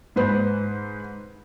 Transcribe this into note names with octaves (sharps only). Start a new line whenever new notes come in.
G#2 B4 C5 B5